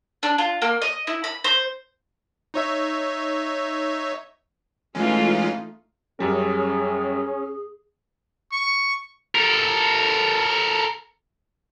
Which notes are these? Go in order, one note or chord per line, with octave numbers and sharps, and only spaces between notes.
D4
F4
A#3
D#5
E4
B5
C5
D#4 C#5 E5
E3 G#3 A3 C#4 D#4 F4
F#2 G3 C#4 G#4 A#4
C#6
A4 A#4